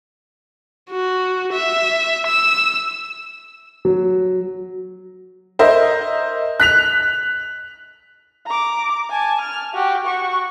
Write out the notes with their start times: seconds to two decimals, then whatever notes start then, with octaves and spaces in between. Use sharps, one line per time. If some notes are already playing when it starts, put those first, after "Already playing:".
0.90 F#4
1.53 E5
2.26 E6
3.85 F#3
5.59 A#4 C5 D#5 E5
6.60 F#6 B6 F7
8.47 A#5 D6
9.10 G#5 A5
9.41 F6
9.74 F#4 G4
10.07 F#4 C#6